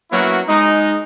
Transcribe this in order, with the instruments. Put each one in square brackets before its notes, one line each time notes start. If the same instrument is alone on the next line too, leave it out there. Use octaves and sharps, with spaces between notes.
[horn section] F#3 A#3 B3 C#4 E4 F#4
G#3 D#4